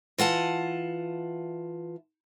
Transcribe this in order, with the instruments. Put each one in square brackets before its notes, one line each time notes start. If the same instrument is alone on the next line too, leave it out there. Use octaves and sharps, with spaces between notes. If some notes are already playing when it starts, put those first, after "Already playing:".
[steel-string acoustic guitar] E3 F4 F#5 A5